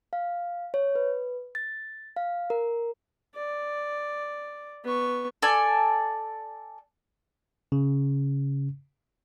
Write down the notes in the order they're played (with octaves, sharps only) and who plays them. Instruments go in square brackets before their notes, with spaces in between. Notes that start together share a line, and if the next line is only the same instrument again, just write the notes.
[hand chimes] F5
C#5
B4
A6
F5
A#4
[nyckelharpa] D5
B3 C#6
[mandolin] A4 D5 G#5
[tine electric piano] C#3